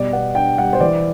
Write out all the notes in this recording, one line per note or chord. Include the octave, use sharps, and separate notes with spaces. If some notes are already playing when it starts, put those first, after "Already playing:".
Already playing: B2 G3 D5
B3 F#5
D4 G5
G3 F#5
C5
E3 D5